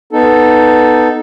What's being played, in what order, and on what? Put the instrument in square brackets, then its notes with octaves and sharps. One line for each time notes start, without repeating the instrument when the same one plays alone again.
[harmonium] B3 D#4 A4